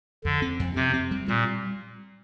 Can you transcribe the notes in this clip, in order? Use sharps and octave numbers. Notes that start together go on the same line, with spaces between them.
F2 D3
C4
F2
C3 C4
C4
G3
A#2 G3